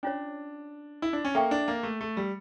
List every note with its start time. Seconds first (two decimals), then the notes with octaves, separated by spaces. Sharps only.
0.03 C#4 D4 F4 C#5
1.02 E4
1.13 D4
1.25 C#4
1.35 A#3 A4 E5 G5 C#6
1.51 D4
1.68 A#3
1.83 A3
2.01 A3
2.17 G3